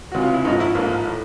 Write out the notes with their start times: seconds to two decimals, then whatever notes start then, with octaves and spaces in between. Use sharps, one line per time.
0.12 C#2 C3 E3 F#4
0.22 F4
0.34 E4
0.45 A1 G#2 F3 D#4
0.60 E4
0.75 A1 G#2 F3 A#3
1.07 A2